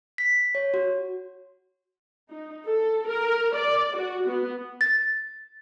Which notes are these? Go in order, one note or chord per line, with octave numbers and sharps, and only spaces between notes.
B6
C#5
F#4
D#4
A4
A#4
D5
F#4
B3
A6